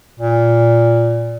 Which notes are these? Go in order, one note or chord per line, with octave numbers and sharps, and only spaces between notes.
A#2